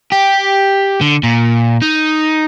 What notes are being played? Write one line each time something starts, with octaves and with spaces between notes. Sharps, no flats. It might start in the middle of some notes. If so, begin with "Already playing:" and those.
G4
D3
A#2
D#4